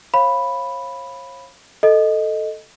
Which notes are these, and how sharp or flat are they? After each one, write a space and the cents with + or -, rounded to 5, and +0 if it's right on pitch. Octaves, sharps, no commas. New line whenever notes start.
C#5 -40 F5 +0 B5 +0
A4 +0 D#5 +0